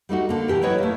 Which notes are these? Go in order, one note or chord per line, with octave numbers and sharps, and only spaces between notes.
G3 A3 D#4 F#4
D3 A#3
B2 E3 G4 A#4
F#3 E4 B4 C#5 D#5
A3 A#3